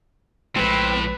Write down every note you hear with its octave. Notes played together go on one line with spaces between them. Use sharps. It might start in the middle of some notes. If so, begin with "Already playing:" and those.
A#1 A2 F3 G#3 C4 B4